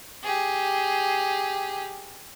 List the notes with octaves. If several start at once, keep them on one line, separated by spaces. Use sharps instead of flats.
G4 G#4